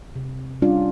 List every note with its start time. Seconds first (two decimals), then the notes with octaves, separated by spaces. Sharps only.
0.15 C3
0.62 G3 C#4 D4 F4 D5